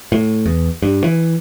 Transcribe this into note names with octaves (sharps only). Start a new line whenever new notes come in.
A2
E2
G2
E3